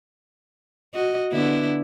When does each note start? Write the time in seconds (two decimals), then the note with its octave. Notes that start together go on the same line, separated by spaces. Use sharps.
0.94 F#4 D#5
1.32 D3 B3 E4